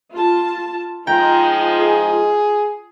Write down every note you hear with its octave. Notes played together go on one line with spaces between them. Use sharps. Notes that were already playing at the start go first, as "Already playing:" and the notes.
F4 A5
F3 G#3 D#4 F4 G5 A#5
G#4